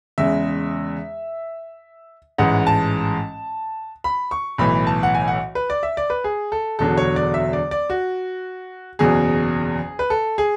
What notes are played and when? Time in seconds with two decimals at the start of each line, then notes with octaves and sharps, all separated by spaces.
0.18 E2 C#3 G#3 E5
2.38 A1 G#2 E3 G#3 F#5
2.67 A5
4.04 B5
4.31 C#6
4.58 B1 A2 E3 B5
4.87 A5
5.03 F#5
5.15 G#5
5.28 F#5
5.55 B4
5.70 D5
5.83 E5
5.97 D5
6.10 B4
6.24 G#4
6.52 A4
6.79 E1 E2 D3 F#3 A4
6.97 C#5
7.16 D5
7.34 E5
7.53 D5
7.71 D5
7.90 F#4
8.99 F#1 E2 B2 G#4
9.99 B4
10.10 A4
10.38 G#4